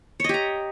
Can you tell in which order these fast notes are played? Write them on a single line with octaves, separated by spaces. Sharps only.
C#5 D#5 G4 A#5